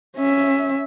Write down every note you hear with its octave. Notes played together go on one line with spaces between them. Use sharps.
C#4 E5